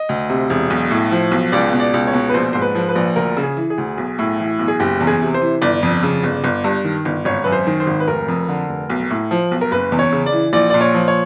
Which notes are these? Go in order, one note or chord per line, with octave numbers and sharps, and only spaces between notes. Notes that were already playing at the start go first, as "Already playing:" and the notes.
Already playing: D#5
D2
C3
E1
B1
A2
F3
B1
C#2 D5
B2
D5
C#2
C#5
B2
B4
A#1 C5
G#2 C5
B4
F3
B4
A#1
D2 A#4
C#3
G#4
E3
G#4
D2
B1
A2
E3
B1
G#4
F#1 G4
E2
G#4
C3
C5
E3
G1 D5
F2
C#3
G1
G1
G2
D#3
G1
G#1 C#5
F#2 B4
C5
D#3
C5
G#1
B4
F1 A#4
F2
D3
F1
B1
A2
F3
B1
A#4
F#1 B4
E2
C#5
C#3
D5
E3
A#1 D5
A#2 D5
C#5
F3
C#5